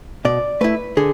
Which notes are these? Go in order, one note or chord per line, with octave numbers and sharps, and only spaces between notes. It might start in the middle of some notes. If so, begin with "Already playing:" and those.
B2 D5
A3 E4 B4
D3 G#4